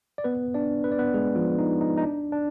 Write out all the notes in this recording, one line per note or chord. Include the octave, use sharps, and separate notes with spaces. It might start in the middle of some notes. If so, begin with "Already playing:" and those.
D5
B3 B4
D4 D5
B4
D5
B3 B4
G#3 G#4
F3 F4
D#4
D#4
D#4
D4
D4